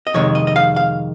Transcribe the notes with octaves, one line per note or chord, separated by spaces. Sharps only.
D#5
F2 C3 D#3 G#3 C#5
D#5
D#5
F5
F5